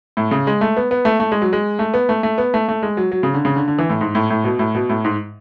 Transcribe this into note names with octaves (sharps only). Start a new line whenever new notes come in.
A2
C#3
G#3
A3
B3
B3
A3
A3
G#3
F#3
G#3
A3
B3
A3
A3
B3
A3
A3
G#3
F#3
F#3
C#3
D3
C#3
D3
D3
E3
A2
G#2
A2
A2
B2
A2
B2
A2
G#2